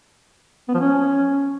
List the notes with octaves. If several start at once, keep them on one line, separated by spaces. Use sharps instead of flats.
B3
F3
C#4